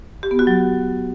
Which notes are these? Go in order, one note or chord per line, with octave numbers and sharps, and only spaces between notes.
G4
B3
F#4
F#3